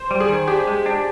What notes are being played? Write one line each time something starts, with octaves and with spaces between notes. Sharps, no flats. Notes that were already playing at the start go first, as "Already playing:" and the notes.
Already playing: C5
G3
G#4
D#3
D4 G4
G#3
D4